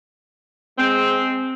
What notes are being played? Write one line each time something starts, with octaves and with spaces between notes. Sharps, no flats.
G#3 C4